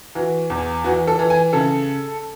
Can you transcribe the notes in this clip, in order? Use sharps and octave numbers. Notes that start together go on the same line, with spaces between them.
E3 F#4
E2
E3 F#4
A4
E3
G#5
C#3 A4